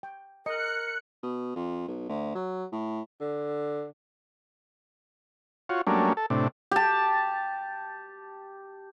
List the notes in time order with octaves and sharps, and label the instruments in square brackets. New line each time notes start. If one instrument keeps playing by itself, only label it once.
[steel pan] G5
[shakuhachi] A#4 [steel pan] D#5 [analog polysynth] F#6 C#7
[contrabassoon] B2
F2
B1
D2
F#3
A2
[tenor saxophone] D3
[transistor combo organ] F4 F#4 C#5
F#3 G3 A3 A#3 C#4 D4
A4
A2 C3 D4
[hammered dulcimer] G4 A5